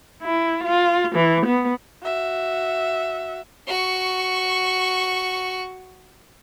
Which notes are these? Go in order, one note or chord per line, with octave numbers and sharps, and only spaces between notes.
E4
F4
E3
B3
F#4 E5
F#4 C#6